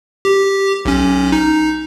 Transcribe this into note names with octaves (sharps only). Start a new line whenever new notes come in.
G4
B1 C#4
D#4